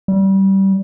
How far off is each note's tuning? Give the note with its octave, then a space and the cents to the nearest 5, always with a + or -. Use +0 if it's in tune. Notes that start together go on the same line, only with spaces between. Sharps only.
G3 -20